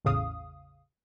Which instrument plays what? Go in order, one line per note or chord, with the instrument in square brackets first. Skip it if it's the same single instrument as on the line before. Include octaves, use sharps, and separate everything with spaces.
[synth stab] A1 E2 A2 C#3 F5 D#6